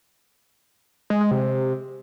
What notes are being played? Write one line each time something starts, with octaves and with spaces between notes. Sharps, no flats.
G#3
G#3
C3